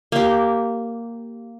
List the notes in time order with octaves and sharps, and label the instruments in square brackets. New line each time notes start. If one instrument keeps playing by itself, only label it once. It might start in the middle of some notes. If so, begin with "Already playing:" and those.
[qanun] A#3 G4